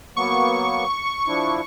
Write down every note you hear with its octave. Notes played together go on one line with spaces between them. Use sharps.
F#3 A#3 B3 C#6
F3 D4 E4